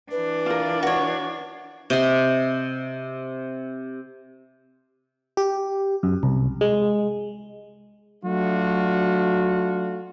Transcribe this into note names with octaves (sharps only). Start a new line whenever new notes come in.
E3 D4 B4
F4 A#4
F#4 C#5
C3 D#5 F#5 C6
G4
F#2
C2
G#3
F#3 A3 D4 F4 F#4